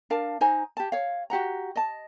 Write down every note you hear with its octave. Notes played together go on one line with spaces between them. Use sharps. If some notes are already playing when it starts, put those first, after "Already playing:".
D4 A#4 F5 A5
D#4 C5 G#5 A#5
G4 A5
C#5 F5
F#4 G4 F#5 A#5
D#5 A5